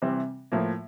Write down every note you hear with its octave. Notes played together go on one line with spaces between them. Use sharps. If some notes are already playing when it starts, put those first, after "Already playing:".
C3 E3 G3 C4
A2 F3 A#3